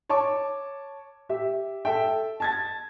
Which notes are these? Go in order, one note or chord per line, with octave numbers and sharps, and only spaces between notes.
C#5 A5 C#6 D6
G4 E5
A4 E5 G5
A5 G#6 A6